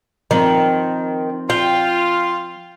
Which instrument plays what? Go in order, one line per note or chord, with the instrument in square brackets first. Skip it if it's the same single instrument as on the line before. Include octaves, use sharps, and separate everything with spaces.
[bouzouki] D#3 [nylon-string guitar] F3 C4 C5
[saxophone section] F4 [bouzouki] G5